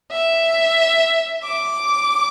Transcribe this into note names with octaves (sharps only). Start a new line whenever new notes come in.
E5
D6